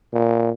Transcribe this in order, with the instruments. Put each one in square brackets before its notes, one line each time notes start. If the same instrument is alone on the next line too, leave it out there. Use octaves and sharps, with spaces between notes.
[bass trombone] A#2